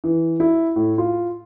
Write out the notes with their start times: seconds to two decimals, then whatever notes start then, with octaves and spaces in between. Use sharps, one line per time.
0.04 E3
0.40 E4
0.76 A2
0.98 F4